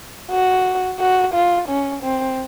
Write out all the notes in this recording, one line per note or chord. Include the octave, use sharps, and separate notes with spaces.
F#4
F#4
F4
C#4
C4